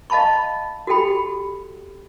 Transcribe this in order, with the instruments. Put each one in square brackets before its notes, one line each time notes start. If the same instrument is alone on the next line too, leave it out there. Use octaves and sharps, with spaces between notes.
[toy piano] D#5 F5 A5 B5 C#6
F#4 G4 A4 G5 B5